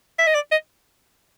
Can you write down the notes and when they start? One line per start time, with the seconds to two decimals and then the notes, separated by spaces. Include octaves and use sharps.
0.18 E5
0.27 D#5
0.35 D5
0.51 D#5